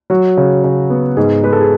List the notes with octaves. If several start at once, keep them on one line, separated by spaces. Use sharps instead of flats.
F#3 F#4
C#3
C#3
B3
G#2 G#4
G#3 B4
A4
G#4